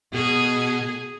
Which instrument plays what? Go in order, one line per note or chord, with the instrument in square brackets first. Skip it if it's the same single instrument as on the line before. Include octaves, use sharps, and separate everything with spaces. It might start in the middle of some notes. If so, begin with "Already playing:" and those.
[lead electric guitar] B2 [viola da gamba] G#4